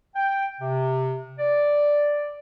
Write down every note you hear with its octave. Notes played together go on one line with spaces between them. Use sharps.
G5
C3
D5